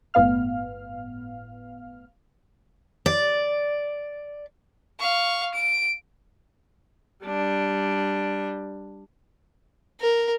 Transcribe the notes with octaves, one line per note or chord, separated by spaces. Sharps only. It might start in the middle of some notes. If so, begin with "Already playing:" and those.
G1 A2 B3 F5 F6
D5
F5 C#6
D7
G3 D4
A#4